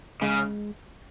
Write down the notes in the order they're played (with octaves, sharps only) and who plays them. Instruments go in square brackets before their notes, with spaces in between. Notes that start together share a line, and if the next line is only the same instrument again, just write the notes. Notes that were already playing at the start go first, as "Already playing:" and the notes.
[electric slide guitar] C#3 [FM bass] G#3